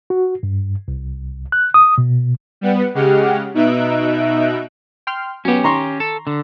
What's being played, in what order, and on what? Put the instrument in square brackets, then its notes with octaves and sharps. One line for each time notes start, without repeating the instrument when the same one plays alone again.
[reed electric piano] F#4
G2
C2
F#6
D#6
B2
[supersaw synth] G3 B3 F#5
C#3 G#3 G4 F#5 F6
B2 D#4 E5 F#6 D7
[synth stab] G5 C6 F6
[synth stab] F#3 B3 [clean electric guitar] C#4 G4
[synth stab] D#3 [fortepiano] A#5 C6 C#6
[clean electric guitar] A4
D3